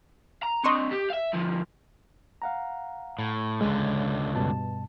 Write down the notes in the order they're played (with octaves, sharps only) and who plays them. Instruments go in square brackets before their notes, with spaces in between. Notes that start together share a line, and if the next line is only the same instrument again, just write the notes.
[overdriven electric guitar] A#5
[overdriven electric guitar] C4 D4 [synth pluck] D#5 C6 C#6
[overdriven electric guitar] G4
E5 F5
D2 F3
[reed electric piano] F5 F#5 A#5
[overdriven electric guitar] A2
[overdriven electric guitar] C#2 D3 [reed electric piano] G#3
[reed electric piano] G2 B2 A5